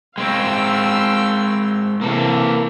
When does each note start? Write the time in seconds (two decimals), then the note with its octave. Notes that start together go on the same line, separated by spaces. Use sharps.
0.18 G#3 C4 F5 G5 E6
2.01 C3 E3 A#3 A4